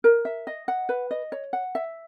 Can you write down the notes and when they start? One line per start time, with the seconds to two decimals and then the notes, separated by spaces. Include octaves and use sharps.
0.04 A#4
0.25 E5
0.47 D#5
0.68 F#5
0.89 B4
1.11 D#5
1.32 C#5
1.53 F#5
1.75 E5